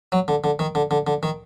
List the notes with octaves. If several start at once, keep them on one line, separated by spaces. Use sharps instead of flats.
F#3
D3
D3
D#3
D3
D3
D3
D#3